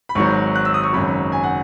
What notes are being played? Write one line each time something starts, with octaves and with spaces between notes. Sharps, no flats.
B5
G#1 G#2 F#3 C#6
F#6
E6
D#6
C#6
G#1 F#2 C#3 F#3 B5
G#5
F#5